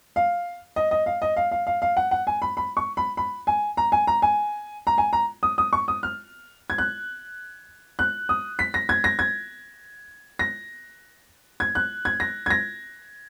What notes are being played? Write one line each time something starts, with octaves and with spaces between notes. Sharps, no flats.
F5
D#5
D#5
F5
D#5
F5
F5
F5
F5
F#5
F#5
G#5
B5
B5
C#6
B5
B5
G#5
A#5
G#5
A#5
G#5
A#5
G#5
A#5
D#6
D#6
C#6
D#6
F6
G#6
F#6
F#6
D#6
B6
A#6
G#6
A#6
G#6
A#6
G#6
F#6
G#6
A#6
G#6
A#6